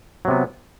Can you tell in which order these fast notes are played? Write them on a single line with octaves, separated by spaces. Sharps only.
F#3 C3 B3